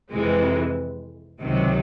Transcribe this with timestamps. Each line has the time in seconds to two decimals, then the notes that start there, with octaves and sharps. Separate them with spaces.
0.11 F2 C3 E3 G#3
1.41 C#2 C3 D#3 F#3